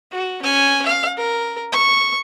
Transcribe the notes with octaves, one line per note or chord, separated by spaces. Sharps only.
F#4
C#4 G#5
F5
A#4
C#6